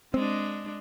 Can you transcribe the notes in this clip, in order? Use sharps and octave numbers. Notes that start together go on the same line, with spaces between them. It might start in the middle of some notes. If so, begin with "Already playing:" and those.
G#3 C4 D4